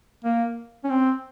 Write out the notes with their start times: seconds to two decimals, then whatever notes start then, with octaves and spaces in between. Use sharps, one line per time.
0.25 A#3
0.84 C#4
0.90 C4